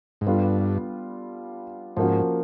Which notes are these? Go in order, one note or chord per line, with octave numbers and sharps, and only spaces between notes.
G#2
G2 G3 B3 D4 F4 A4
G#2 F3 A#3 C#4 F#4